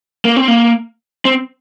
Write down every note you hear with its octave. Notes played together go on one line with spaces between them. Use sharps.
A#3
C4
A#3
C4